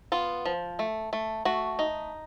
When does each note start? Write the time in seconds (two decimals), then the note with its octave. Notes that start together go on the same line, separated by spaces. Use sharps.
0.12 B3 F4
0.45 F3
0.79 A3
1.13 A3
1.45 A3 F#4
1.79 D#4